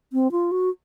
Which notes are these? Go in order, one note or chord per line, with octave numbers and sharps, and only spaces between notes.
C4
F4
F#4